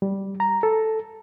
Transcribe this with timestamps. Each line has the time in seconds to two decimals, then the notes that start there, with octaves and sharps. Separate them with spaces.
0.02 G3
0.40 A#5
0.63 A4